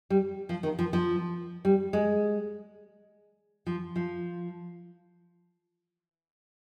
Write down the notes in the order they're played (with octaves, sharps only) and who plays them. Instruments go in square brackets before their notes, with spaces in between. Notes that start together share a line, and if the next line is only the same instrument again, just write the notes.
[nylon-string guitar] G3
F3
D#3
F3
F3
G3
G#3
F3
F3